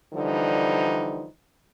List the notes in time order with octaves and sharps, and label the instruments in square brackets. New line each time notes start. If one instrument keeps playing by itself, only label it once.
[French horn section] D3 E3 F3 G3 D#4